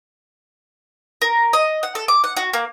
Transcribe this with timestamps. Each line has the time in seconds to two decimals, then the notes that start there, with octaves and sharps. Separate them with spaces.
1.22 A#4
1.53 D#5
1.83 F#5
1.95 A4
2.08 D6
2.24 F#5
2.37 F#4
2.53 A#3